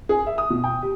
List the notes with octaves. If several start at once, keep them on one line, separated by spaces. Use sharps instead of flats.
G#4
E5
D#6
B2
G5
G4